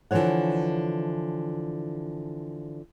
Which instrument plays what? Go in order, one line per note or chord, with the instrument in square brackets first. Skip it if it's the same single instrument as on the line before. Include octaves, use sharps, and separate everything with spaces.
[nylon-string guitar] D3 E3 F3 C#5 F#5